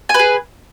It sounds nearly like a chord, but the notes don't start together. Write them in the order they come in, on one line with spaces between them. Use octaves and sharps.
G#5 B4 G#4